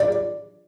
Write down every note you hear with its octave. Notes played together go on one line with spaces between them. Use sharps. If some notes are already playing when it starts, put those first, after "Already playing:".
Already playing: D5